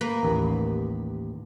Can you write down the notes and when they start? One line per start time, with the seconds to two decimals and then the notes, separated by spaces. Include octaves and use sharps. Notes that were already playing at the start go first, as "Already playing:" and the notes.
0.01 A#3 B4
0.23 A1 D#2